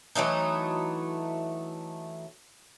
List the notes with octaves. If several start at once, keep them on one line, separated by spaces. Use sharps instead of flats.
E3 F#3 A3 D#4